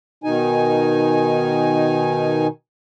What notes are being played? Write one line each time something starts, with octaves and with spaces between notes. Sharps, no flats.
B2 D#3 D#4 G#5